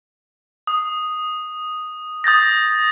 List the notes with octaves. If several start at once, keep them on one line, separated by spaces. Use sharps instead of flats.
D#6
D#6 G6 A6 A#6